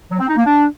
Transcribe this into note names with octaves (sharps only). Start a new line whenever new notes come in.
F#3
C4
D#4
A#3
D4